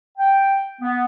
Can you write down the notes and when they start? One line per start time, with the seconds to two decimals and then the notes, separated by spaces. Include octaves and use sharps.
0.18 G5
0.81 B3